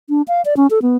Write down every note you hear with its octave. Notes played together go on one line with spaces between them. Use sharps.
D4
F5
D5
C#4
A4
B3